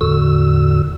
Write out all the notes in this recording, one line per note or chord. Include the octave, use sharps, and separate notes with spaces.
E2 A2 D3 F#4 E6